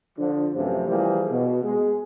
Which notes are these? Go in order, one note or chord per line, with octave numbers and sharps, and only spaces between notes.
D3 F3
F#2 A2 C3 E3 F3
E3 F3 G3 A#3 G#4 C5
B2
G#3